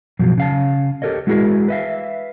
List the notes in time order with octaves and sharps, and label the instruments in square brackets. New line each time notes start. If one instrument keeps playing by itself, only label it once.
[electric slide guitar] F#2 B2 F3 F#3
C#3 F5 A5
G4 A4 A#4 C#5 D#5
G#3 E4 F#4 G#4 A#4
B4 E5 F5